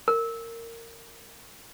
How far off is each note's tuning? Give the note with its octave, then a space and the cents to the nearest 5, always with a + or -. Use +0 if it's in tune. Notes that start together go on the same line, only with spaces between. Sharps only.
A#4 -20